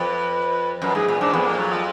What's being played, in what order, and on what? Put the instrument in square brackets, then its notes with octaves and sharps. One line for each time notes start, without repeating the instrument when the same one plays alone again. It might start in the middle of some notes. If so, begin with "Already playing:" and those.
Already playing: [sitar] F2 [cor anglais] B4
[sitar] F#2 [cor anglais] B4
[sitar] G#2 [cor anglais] G#4
[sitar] A#2
[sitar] G#2 [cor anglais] D4
[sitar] F2 [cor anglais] B3
[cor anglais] A#3
F#3
F3